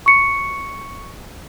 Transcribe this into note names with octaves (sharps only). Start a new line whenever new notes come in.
C#6 C#7